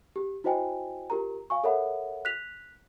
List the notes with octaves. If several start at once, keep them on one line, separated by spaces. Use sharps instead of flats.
G4
E4 F#4 C5 D#5 G5 G#5
F4 G4 A#4 A#5
F5 G#5 C#6
A4 A#4 C#5 E5 F#5 B5
F#6 B6 F7